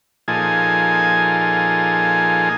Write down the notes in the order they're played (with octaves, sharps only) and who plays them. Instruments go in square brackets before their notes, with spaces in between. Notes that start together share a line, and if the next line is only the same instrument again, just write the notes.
[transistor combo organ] A#2 F3 D#4 G#4 A4 G#5